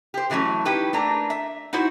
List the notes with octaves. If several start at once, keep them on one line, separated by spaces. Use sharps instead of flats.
G4 C5
D3 E3 F#3 A3 C#4
D#4 E4 G4 B4
A3 A#3 D4 A#5
E5
D#4 E4 F#4 C5